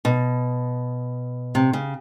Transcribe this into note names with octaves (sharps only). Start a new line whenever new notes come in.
B2
C3
C#3